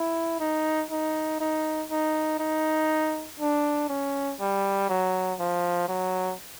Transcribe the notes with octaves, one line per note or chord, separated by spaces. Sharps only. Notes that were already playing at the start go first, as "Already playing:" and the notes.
Already playing: E4
D#4
D#4
D#4
D#4
D#4
D4
C#4
G3
F#3
F3
F#3